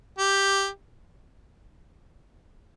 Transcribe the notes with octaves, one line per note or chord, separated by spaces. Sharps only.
G4